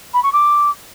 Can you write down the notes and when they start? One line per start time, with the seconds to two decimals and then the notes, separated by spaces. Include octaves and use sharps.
0.13 B5
0.23 C#6
0.32 D6